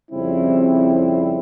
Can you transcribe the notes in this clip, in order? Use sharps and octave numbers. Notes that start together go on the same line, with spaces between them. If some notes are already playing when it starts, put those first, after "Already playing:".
F2 C#3 G3 C4 E4